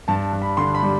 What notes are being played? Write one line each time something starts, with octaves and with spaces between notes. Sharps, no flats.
G2 A5
G2
B5
D3 C6
B5
G3